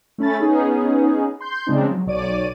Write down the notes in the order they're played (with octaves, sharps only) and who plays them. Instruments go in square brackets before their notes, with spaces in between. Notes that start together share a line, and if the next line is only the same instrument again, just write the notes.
[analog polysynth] A3 C#4 B5 A6
B3 C#4 D#4 G#4
C6 G6
C#3 F3 G#3 C4 D4 D#4
F#3
B1 C#5 D5 D6 D#7